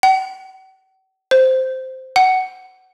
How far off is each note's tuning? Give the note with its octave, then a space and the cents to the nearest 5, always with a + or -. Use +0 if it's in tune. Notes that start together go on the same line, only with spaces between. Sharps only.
F#5 +45
C5 -5
F#5 +15